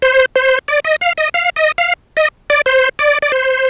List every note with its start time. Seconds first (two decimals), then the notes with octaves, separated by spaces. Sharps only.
0.02 C5
0.36 C5
0.68 D5
0.85 D#5
1.01 F5
1.18 D#5
1.34 F5
1.56 D#5
1.78 F5
2.17 D#5
2.50 D5
2.66 C5
2.99 D5
3.22 D5
3.32 C5